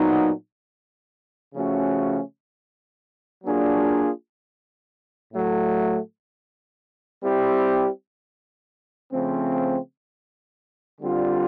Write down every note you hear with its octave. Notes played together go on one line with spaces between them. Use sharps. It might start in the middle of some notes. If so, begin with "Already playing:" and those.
Already playing: A#2 F#3 B3 D#4
C#3 F3 A3 C#4 F#4
F#3 A#3 D4 F4 G#4
A2 F#3 A3
G3 C4 E4 G4
C#3 F3 A3 C4
D3 G3 C4 F4